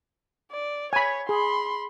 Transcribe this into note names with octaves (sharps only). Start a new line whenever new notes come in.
D5
C#5 G#5 B5
G#4 B5 C6